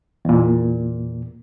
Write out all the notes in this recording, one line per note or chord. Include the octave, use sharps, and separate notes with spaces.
E2 A#2